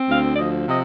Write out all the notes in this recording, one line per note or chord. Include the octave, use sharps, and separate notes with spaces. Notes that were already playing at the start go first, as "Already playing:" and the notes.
Already playing: C4
D2 F5
D5
F3 D#5
C3 D#5